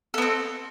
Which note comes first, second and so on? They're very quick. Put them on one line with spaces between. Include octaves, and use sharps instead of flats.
A4 B3 C4